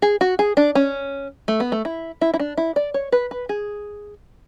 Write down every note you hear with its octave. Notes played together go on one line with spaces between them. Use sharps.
G#4
F#4
G#4
D4
C#4
A3
B3
A3
E4
E4
E4
D4
E4
D5
C#5
B4
B4
G#4